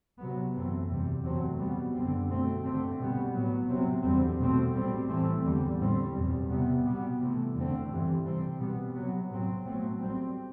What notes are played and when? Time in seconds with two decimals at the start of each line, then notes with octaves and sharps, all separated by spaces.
0.19 C3 F#3 B3
0.54 F#2 E3 A3 C4
0.89 E2 C3 G3
1.24 E2 C3 F#3 A3 C4
1.59 B2 G3 B3
1.94 F#2 D3 G3 C4
2.29 B2 A3 C4
2.63 G2 D3 A3 C4
2.99 B2 G3 B3
3.34 A2 F#3 B3
3.69 C3 F#3 C4
4.04 E2 D3 G3 C4
4.39 B2 A3 C4
4.74 A2 G3 C4
5.09 A2 E3 A3 C4
5.44 E2 D3 G3
5.79 A2 G3 C4
6.14 E2 B2 G3
6.49 C3 G3 B3
6.85 B2 G3 B3
7.19 C3 E3 A3
7.54 E2 D3 A3 C4
7.89 G2 E3 G3 C4
8.25 C3 G3 C4
8.59 B2 G3 B3
8.95 C3 F#3 B3
9.29 A2 F#3 C4
9.65 B2 F#3 A3 C4
10.00 A2 G3 C4